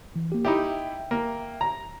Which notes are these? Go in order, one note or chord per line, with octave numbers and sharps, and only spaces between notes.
E3
A#3 G4
D#4 E4 G4 E5 G5
A#3
A#5